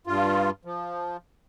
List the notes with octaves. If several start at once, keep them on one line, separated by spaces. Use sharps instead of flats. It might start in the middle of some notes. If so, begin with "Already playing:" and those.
G2 F4
F3